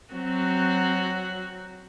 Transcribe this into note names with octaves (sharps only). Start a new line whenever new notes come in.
F#3 C4 F#4